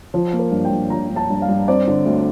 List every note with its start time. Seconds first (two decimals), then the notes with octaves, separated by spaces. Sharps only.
0.14 F3
0.33 A#3
0.39 A#4
0.51 G2
0.65 G5
0.71 G2
0.90 F3 A#5
1.10 G2
1.16 A5
1.30 G2
1.42 F5
1.48 G2
1.68 C4 D5
1.87 D3
2.06 D2